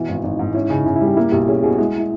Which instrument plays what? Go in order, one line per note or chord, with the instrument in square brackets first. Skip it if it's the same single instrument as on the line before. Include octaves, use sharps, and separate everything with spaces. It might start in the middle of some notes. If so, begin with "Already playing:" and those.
Already playing: [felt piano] B2 E3 [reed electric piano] E4
[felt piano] G#1
[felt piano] G#1 [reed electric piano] D#4
[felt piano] G#2
[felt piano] C#4 [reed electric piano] E4
[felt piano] C#3 [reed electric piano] D#4
[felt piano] C#3 [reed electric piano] E4
[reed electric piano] E4
[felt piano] G3
[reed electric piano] G4
[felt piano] A#3 [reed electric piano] E4
[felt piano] B1 [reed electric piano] G4
[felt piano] C#4 [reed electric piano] G#4
[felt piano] B2 [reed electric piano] G#4
[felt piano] G#3 [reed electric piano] E4
[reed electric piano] E4